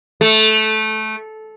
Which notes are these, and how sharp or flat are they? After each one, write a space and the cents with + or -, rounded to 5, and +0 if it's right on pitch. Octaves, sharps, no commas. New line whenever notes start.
A3 -15